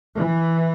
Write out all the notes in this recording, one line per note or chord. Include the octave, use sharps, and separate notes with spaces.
E3